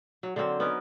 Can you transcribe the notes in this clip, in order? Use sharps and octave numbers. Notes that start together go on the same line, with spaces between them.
F#3
D3 F#3 A#3 C4
B3 C#4 D#4 A#4